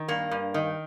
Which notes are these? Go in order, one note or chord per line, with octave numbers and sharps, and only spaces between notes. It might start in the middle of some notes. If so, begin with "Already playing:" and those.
Already playing: D#3
G2 A#3
G2
D#3